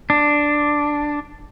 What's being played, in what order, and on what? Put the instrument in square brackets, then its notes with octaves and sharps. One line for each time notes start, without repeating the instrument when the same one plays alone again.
[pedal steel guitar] D4